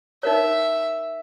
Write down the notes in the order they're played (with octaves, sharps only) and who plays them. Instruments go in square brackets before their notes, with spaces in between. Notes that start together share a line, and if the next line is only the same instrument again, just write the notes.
[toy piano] D#4 A#4 C#5 [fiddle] E5